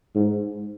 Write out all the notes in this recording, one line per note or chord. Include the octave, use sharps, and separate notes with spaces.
G#2